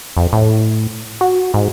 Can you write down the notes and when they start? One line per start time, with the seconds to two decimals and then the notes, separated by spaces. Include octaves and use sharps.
0.17 F2
0.33 A2
1.21 F#4
1.54 G#2